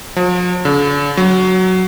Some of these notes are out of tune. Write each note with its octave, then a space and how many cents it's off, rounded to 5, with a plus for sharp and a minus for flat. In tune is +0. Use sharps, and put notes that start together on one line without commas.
F3 +45
D3 -45
F#3 +5